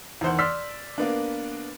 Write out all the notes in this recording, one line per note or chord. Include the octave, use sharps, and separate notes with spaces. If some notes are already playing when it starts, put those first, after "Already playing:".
E2 D#3 C5 F#5
D5 C6 E6 F6 B6
A#3 B3 D4